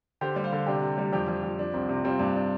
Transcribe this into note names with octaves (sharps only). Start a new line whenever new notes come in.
D3 G4 C5
G3
C5 F5
D3
C3 D4 G4
C3
G3
F2 D4 G4
F2
F2
F3 D4
C2 C4
C3 D4
G3 C4 F4
G2 D4
D4